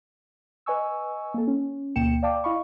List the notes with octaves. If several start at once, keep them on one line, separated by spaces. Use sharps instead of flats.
B4 D#5 G#5 C#6 E6
A#3 A4
C#4
D2 B2 A#3 G5 C#7 E7
D5 F5 G5 A5 D6
E4 D#5 F5 B5 C#6